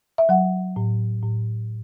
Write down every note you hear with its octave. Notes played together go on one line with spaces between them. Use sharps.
E5
F#3 F#5
A2
A2